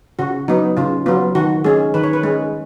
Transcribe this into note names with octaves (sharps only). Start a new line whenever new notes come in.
C#3 F#4
F#3 B3 D#4
C#3 F4
F#3 B3 F4
D#3 F#4
G#3 C#4 G#4
D#3 B4
C#5
B4
G#3 C#4